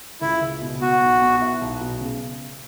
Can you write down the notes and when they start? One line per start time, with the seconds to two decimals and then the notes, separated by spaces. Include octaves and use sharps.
0.21 C#2 E4
0.42 C#2
0.62 B2
0.81 B3 F#4
1.01 B1
1.22 B2
1.41 E4
1.61 B1
1.81 B2
2.01 C#3